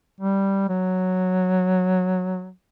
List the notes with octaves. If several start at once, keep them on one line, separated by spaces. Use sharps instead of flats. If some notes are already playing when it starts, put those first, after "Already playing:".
G3
F#3